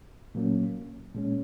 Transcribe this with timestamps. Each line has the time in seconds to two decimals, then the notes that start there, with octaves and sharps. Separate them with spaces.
0.35 A#2 F#3 A#3 C#4
1.14 A#2 G#3 C#4